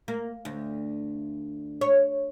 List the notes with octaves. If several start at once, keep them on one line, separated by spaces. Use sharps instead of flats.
A#3
D2
C#5